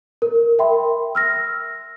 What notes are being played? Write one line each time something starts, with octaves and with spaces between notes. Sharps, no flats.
A#4
A#4 E5 G5 B5 C6
E6 F6 A#6